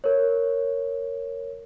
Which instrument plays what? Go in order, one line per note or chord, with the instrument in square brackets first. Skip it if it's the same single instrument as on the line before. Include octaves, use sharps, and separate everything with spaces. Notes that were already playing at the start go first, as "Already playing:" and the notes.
[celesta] A#4 C#5